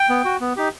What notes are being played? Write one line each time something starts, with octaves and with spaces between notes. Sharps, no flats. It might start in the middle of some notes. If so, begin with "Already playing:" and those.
Already playing: G5
B3
F#4
B3
D#4 G4